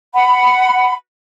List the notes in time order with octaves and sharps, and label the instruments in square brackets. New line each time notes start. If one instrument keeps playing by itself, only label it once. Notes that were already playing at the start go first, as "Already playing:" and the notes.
[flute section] F#5 B5